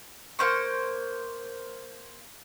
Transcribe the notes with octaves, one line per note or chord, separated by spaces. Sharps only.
A#3 C5 C#6